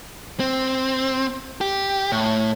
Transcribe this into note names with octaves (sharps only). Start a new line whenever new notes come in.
C4
G4
A2